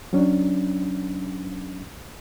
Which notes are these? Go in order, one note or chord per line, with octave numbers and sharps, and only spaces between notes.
F#3 C#4 D4